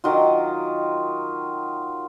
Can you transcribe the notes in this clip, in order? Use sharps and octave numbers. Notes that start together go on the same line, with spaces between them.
D#3 F#3 F4